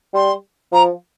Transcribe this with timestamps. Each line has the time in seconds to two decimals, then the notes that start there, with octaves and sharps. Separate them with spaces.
0.14 G3 C6
0.72 F3 A#5